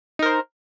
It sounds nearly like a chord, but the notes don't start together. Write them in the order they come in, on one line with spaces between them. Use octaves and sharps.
D#4 A#4 C5